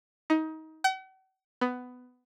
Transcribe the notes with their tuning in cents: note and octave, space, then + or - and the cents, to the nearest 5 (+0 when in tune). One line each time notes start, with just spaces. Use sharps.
D#4 +25
F#5 +45
B3 +15